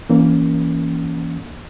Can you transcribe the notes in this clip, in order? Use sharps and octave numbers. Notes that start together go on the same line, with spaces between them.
E3 A#3 C#4